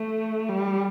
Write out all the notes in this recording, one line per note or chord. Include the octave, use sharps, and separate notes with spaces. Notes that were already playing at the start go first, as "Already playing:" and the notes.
Already playing: A3
G3